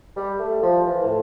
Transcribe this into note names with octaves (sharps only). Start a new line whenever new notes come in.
G3
A3
F3
E3
A2